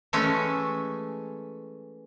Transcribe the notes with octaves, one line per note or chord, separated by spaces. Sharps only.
E3 G#3 A3 C#4